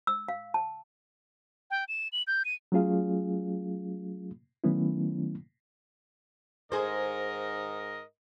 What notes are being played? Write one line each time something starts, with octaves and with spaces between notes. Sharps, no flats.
E6
F5
A5
G5
E7
F#7
G6
D#7
F#3 A3 C#4 F4 G#4 F5
D#3 F#3 A3 B3 C#4 E4
G#2 G#4 A#4 C5 D#5